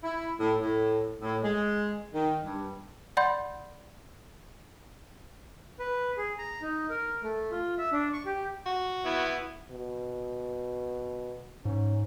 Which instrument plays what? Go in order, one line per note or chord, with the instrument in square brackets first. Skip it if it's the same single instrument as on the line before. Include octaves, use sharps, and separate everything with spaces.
[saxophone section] E4
A2
A2
A2
G#3
D#3
G2
[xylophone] D5 F#5 B5 C6 G6
[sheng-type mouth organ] B4
G#4
A#5
D#4
A#4
A3
F4
E5
D4
C#6
G4
[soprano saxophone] F#4
[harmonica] B3 E4
[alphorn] B2
[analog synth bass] G#2 [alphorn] C#4